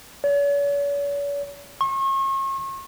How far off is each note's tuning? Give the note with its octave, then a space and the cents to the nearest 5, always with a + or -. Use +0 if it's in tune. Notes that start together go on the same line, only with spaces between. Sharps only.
C#5 +45
C#6 -40